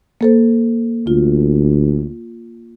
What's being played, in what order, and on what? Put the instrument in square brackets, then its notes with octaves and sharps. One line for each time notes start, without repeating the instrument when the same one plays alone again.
[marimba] A#3 A4 C5
[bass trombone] D2 [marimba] F4